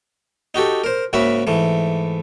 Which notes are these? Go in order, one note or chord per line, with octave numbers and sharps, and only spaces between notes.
D#4 F#4 G4 A4
A#4 C5
G#2 C#3 A#3 F#4 E5 B5
G#2 E3 A3